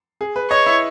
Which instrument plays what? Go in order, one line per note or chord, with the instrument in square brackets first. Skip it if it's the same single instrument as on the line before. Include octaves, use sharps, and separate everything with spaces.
[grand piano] G#4
B4
[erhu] C#5 [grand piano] D#5
[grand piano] E4